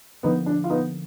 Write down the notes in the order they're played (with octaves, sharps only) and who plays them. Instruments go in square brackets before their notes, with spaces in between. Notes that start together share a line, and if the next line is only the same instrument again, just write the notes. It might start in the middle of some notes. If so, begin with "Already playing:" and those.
[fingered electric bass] D3 F3 A#3 [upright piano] B3 D#4
[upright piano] D4
F4
B3 D#4